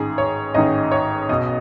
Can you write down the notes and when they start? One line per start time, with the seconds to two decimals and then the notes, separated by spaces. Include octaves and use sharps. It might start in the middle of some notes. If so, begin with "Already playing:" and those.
Already playing: A1 G#2 D#3 G#4
0.18 C#5
0.54 A1 G#2 D#3 D#5
0.92 C#5
1.29 B1 B2 D#5